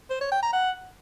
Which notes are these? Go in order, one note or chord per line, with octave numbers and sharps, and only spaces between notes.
C5
C#5
G5
A#5
F#5